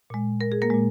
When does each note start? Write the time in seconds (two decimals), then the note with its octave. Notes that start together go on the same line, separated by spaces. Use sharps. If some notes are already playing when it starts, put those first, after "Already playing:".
0.10 A#2 G#3
0.41 A#4
0.52 G#4
0.62 A#3 A#4
0.70 A#2 G#3